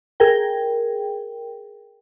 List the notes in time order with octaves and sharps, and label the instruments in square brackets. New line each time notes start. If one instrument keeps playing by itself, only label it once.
[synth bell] G#4 A#4 G5